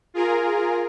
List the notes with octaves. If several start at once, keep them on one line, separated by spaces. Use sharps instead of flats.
F4 G#4 A#4